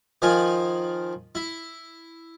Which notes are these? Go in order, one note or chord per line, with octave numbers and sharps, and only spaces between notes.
D#3 F3 F4 G#5
E4